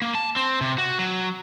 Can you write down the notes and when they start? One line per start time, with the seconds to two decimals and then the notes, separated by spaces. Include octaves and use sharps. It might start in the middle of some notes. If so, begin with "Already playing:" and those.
0.02 A#3
0.15 A5
0.36 C4
0.61 C3
0.78 F#4
0.99 F#3